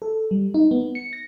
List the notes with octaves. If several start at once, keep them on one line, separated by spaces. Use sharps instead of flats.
A4
G3
D#4
B3
C#7
A#6